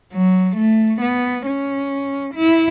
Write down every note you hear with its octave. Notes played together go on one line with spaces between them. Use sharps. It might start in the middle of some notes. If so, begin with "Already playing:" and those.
F#3
A3
B3
C#4
E4